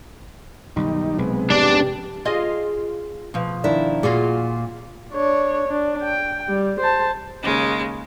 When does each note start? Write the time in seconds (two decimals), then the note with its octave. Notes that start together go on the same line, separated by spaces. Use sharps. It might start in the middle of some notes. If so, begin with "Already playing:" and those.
0.76 B1 G2 D#3 G3 D#4
1.18 B1 C3 G#3 B3
1.50 F1 G#2 D4 G4 D5
2.25 F4 G#4 D#5
3.34 B2 F3
3.64 D#3 D4 E4
4.03 A#2 F4 F#4 G#4
5.13 D4 C#5
5.68 D4
6.03 G5
6.49 G3
6.80 C5 A5
7.41 D#2 C#3 G#3